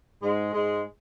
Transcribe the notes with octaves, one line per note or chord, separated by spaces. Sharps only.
G#2 G#3
G#2 G#3